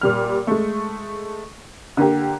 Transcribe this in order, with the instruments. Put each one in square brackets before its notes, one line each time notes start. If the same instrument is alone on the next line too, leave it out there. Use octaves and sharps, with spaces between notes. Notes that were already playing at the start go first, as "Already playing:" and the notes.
[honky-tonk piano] A#2 G3 F6
G#3 A3
D3 A#3 G4